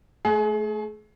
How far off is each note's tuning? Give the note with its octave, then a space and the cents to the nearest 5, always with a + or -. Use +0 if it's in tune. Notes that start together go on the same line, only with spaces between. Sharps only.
A3 -15 G#4 +30